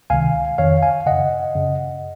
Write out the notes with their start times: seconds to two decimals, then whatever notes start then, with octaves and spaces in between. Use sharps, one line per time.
0.10 C#2 C3 D#3 F5 G#5
0.58 F2 D#3 C#5 F5
0.82 F5 G#5
1.06 F#2 C#3 D#5 F#5
1.55 F#2 C#3